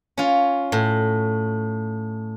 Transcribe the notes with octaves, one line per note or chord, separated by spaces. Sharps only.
C#4 F4
A2